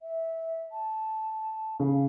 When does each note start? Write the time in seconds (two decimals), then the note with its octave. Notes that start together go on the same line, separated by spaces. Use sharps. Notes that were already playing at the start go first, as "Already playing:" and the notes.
0.01 E5
0.72 A5
1.80 C#3 F5